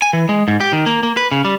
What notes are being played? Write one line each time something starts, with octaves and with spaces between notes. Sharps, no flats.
G#5
E3
G#3
G#2
G4
D#3
A#3
A#3
B4
C#3
G3